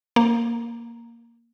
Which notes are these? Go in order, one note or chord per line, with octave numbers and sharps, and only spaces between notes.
A#3